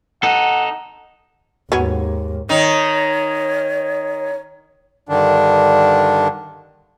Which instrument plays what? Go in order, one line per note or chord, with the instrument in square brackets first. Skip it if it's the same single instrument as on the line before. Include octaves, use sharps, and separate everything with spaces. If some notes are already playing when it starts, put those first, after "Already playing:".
[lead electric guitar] D#4 A4 [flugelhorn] F#5
[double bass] D#2 G#2 [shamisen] F#3 B3 C#4
[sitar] D#3 D#4 [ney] C#5
[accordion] G2 D3 D#3 D4